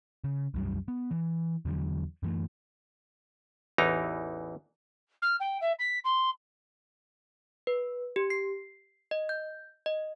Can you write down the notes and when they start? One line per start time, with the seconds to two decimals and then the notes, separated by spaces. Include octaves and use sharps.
0.24 C#3
0.54 C2 F#2 G3
0.88 B3
1.11 E3
1.65 E2 D3 F#3
2.23 F#2 E3 A3
3.78 A1 E2 E3 D#4 A#5
5.22 F6
5.40 G5
5.61 E5
5.79 B6
6.04 C6
7.67 B4
8.16 G4
8.30 C7
9.11 D#5
9.29 G6
9.86 D#5